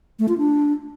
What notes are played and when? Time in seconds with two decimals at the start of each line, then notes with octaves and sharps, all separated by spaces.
0.19 A3
0.28 F4
0.38 D4